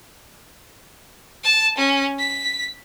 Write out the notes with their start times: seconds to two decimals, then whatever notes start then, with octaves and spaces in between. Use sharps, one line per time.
1.44 A5
1.77 C#4
2.19 B6